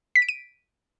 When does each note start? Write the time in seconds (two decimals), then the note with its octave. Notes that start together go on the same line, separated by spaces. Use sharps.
0.16 B6
0.22 D7
0.29 D#7